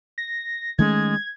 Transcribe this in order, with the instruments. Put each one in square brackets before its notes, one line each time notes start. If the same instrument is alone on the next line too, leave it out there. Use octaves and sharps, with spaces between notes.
[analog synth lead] A#6
[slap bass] D#3 A3 C#4 [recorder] G#3 [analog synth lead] G#6